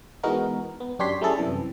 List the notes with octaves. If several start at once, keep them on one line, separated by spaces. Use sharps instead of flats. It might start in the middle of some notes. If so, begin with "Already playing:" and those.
E3 G#3 B3 D#4 F#4 A#4
B3
F#2 D4 G4 C#5 C6 B6
G3 A3 C#4 E4 G#4 A4
F#2 C3 E3 G3